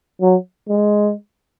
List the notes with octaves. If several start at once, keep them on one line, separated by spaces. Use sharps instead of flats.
F#3
G#3